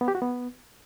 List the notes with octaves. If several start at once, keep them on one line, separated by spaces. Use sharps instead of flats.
B3
G4
F#4
B3